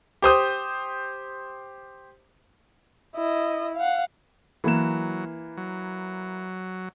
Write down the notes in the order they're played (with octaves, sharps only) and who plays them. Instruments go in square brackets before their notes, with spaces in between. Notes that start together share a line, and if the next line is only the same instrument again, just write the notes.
[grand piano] G4 C5 D#6 G6
[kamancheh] E4 D#5
F5 F#5
[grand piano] E3 A#3 E7 [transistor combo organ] F#3
[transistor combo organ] F#3